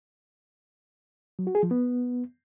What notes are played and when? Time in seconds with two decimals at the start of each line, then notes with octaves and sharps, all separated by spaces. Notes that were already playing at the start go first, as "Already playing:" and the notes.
1.39 F#3
1.47 F#4
1.55 G#4
1.63 F3
1.71 B3